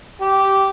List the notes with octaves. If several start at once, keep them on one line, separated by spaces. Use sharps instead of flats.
G4